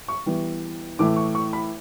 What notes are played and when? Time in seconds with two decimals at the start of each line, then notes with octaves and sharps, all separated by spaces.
0.08 C#6
0.26 E3 G3 B3
0.99 A2 E3 A3 D6
1.16 C#6
1.35 C#6
1.53 B5